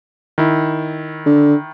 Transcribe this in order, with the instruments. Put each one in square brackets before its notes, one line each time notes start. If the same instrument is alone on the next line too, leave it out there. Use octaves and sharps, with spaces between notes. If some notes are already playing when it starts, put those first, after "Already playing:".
[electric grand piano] D#3 E4
[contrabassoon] D3